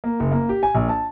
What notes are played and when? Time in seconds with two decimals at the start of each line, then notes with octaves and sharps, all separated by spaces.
0.04 A#3
0.20 F#1
0.32 A#3
0.49 G4
0.63 G#5
0.75 A#1
0.89 A5